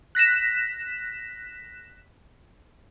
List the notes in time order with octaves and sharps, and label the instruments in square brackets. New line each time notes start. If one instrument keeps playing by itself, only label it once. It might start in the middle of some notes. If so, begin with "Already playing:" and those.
[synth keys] F#6 A#6 B6 E7